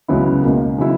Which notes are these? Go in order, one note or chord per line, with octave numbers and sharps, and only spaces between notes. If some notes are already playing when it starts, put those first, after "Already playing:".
C#2 C#3 F#3 B3 E4
C#2 B2 A#3
C#3 F#3 B3 E4